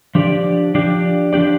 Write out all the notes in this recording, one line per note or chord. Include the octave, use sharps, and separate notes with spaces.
F3 D4 G4 D5
F3 D4 G4 D5
F3 D4 G4 D5